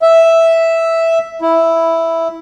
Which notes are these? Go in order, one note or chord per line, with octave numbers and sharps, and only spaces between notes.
E5
E4